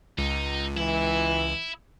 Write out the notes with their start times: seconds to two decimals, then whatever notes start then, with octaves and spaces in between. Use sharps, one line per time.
0.18 C#2 D#4
0.77 E3 E4